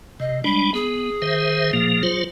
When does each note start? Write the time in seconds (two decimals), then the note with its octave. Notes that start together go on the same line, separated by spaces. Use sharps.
0.20 C3 D#5
0.44 G3 G#3 D4 B5
0.74 B3 G#4
1.22 D#3 C5 E5
1.73 A#2 F3 A#3
2.03 F#3 F4 C5